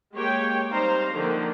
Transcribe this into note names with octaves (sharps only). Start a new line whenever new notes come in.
G#3 A#3 G4 C#5 G5
G3 C4 D#4 C5 F5 A#5
D3 D#3 F3 A#3